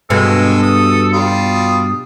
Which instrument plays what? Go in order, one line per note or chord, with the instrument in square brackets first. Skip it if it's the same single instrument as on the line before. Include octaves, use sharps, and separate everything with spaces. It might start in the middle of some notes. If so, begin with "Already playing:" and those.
[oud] G2 B2 [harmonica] G#3 [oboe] A4
[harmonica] D#6
[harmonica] G3 F4 [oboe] D#6